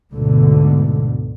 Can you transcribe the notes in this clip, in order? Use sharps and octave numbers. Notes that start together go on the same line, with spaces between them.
D2 G#2 B2 D3